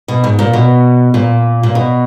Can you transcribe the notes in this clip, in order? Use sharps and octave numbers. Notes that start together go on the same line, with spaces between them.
B2
G#2
A#2
B2
A#2
A#2
B2